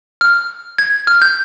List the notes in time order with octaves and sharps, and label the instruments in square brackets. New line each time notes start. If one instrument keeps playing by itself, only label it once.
[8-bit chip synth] F6
G#6
F6
G6